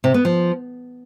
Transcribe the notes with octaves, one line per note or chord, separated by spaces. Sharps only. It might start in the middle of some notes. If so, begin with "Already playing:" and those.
C3
B3
F3